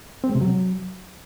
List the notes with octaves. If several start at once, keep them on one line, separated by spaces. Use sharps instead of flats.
C4
G#3
C3
F#3